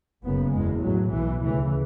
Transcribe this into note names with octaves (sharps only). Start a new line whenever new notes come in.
F#1 F#2 C#3 B3
F#1 E2 B2 G#3
A1 A2 F#3
B1 B2 E3
D2 C#3 E3